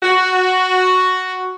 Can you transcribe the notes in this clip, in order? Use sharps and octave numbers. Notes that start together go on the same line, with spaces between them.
F#4